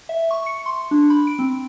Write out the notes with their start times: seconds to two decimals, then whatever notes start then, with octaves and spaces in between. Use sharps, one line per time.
0.09 E5
0.31 C#6
0.46 C#7
0.66 C6
0.91 D4
1.10 B5
1.27 D7
1.39 C4